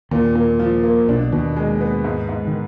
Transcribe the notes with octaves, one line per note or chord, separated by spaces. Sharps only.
D#2 A#2 D#3
A#2
F3
A#3
B1 B2 D4
D#2 B2 D#3
G#3
B3
G#2
G#2
D#3